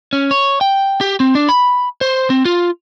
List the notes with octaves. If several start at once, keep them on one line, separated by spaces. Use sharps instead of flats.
C#4
C#5
G5
G4
C4
D4
B5
C5
C4
F4